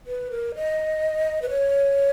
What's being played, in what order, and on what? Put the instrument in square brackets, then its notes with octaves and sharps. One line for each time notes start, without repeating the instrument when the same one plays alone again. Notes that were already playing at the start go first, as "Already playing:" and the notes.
[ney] B4
A#4
D#5
B4
C#5